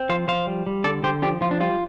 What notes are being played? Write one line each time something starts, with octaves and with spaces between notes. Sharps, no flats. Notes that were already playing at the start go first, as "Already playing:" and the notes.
Already playing: C4
F3 C5 F5
F3 C5 F5
G3
G3
D3 A4 D5
D3 G4 C5
F3 D4 G4
F3 F4
D4
G3 F4